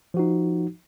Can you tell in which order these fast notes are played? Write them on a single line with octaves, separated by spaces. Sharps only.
F3 F#4 D#4